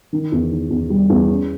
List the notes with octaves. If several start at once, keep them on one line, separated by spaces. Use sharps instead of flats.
D#3
E2
D#3
E2
G3
E2
C#4